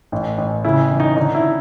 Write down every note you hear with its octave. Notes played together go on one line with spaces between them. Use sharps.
A1
A1
C#3 E4
E3
D#4
D3 D#4
E4